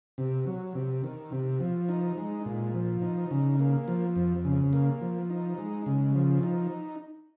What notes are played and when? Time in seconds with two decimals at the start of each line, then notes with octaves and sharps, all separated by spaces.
0.18 C3
0.46 F#3
0.75 C3
1.04 D#3
1.32 C3
1.60 F3
1.89 D#4
2.17 G#3
2.46 A#2
2.74 F3
3.02 D#4
3.31 C#3
3.59 A#3
3.88 F3
4.16 F2
4.44 C#3
4.73 A#3
5.01 F3
5.30 D#4
5.58 G#3
5.86 C#3
6.15 F3
6.43 D#4